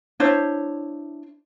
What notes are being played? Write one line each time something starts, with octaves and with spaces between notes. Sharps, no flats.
D4 E4 C5 C#5